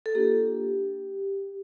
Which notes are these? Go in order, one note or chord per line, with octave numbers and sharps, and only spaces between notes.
A4
A#3 D4 F4 G4